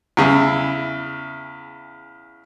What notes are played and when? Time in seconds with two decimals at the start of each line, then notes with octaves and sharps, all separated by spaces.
0.17 E2 C#3 E4